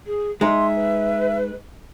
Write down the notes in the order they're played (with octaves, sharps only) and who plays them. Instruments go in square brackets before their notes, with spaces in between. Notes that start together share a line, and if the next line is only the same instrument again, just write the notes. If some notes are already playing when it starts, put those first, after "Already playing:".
[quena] G#4
[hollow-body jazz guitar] G#3 D#4 [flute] E5 [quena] C6
[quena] B4